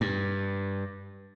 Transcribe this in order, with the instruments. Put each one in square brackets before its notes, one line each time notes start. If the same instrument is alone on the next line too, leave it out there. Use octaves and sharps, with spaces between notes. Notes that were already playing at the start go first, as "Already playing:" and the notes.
[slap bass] G2